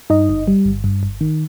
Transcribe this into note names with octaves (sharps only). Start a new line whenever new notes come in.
G2 D#4 D#5
G1
G3
G1
G2
G1
D#3